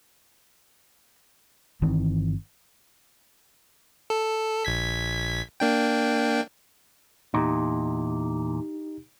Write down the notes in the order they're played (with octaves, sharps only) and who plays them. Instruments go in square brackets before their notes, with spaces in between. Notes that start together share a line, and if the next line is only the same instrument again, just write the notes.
[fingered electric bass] G1 D#3 E3 C4
[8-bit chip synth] A4
A#1 G#6 B6
A#3 D4 G5
[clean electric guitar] E2 A#2 [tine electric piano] D#4 G4